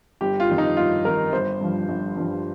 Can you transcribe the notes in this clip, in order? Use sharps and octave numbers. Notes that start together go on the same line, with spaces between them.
G1 G4
F4
F2 D#3
D#4
G1 F4
F2 D#3 A#4
G1 C5
G2 F3
G1
G2 F3